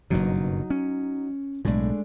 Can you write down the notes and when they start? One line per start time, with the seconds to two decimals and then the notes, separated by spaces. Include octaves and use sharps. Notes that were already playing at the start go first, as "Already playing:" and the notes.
0.10 F#1 G2 B2 F#3 D#4
0.70 C#4
1.65 B1 A2 G#3 A3 D4